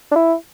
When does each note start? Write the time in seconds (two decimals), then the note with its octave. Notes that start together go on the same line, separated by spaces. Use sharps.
0.12 D4
0.16 E4